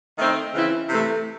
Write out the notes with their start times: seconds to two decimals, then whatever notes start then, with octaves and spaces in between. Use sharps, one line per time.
0.19 D#3 A3 C4 D#4
0.54 C#3 E3 C4 E4
0.89 C3 E3 A3